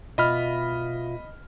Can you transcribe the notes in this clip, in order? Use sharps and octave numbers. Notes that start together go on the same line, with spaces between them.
B2 F4 D#5 E5 B5 F6